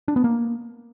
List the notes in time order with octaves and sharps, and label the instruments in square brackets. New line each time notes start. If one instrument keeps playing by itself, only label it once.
[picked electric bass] D4
B3
A#3